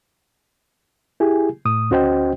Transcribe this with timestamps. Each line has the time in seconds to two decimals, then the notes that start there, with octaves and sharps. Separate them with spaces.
1.20 E4 G4 G#4 G#5
1.65 A2 D#6
1.90 D2 C#4 F#4 C5 D#5 G5